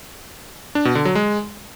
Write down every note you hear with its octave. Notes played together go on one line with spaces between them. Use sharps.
D4
B2
D3
F#3
G#3